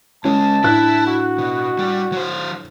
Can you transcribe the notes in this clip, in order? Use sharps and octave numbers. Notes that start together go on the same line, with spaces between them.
C#2 G#3 C#4 A5
A2 D4 E4 F#6
F#4
B2
G3
F#3 C5